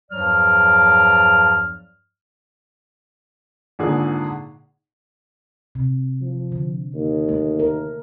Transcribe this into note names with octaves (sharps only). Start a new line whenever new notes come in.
E2 G2 F3 F#3 D5 F6
G#1 A#2 D3 G#4
C3
F3
D3
D#2
A3
A#4